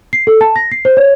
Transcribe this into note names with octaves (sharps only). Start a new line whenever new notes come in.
C7
A4
A5
A#6
C7
C5
C#5